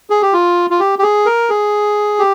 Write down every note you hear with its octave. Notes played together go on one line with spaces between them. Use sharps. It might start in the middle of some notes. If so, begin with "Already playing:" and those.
G#4
G4
F4
F4
G4
G4
G#4
A#4
G#4
G4